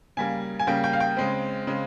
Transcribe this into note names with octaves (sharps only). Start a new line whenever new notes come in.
C#3 G3 A#3 G#5
G#5
C#3 G3 A#3 G5
G5
F5
G5
C#3 G#3 C4
C#3 G#3 C4